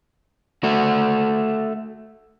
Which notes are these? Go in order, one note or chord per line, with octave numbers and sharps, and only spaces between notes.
A3 F#4